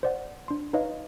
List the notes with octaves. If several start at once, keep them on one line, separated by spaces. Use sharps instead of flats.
C5 D5 F#5
D4 C6
D#4 B4 C#5 D#5 F5